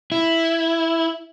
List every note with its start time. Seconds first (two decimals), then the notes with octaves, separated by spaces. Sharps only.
0.12 E4